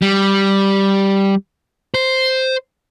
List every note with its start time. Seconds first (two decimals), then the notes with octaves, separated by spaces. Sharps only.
0.02 G3
1.94 C5